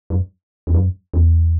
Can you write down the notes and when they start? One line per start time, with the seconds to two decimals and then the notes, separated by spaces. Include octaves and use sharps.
0.10 F#2
0.67 E2
0.74 F#2
1.14 E2